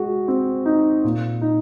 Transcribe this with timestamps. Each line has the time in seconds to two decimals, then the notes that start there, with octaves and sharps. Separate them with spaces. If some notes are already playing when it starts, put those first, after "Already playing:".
Already playing: G#3 F#4
0.28 C4
0.66 D#4
1.04 A#2
1.42 D#4